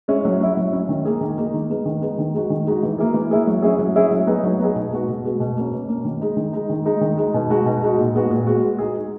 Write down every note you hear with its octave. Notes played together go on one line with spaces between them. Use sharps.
G#3 C#4 E4
F#3
C#4 E4
F#3
C#4 E4
D#3
A#3 D#4 G#4
D#3
A#3 D#4 G#4
D#3
G#3 B3 D#4
D#3
G#3 B3 D#4
D#3
G#3 D#4 F#4
D#3
G#3 D#4 F#4
E3
A#3 E4 G#4
E3
A#3 E4 G#4
F#3
C#4 E4 G#4
F#3
C#4 E4 G#4
F#3
B3 D#4 G#4
F#3
B3 D#4 G#4
B2
G#3 B3 F#4
B2
G#3 B3 F#4
B2
A#3 C#4
B2
A#3 C#4
D#3
G#3 D#4
D#3
G#3 D#4
D#3
G#3 D#4
D#3
G#3 D#4
B2
G#3 D#4 F#4
B2
G#3 D#4 F#4
A#2
G#3 B3 F#4
A#2
G#3 B3 F#4
G#3
D#4 G#4
G#3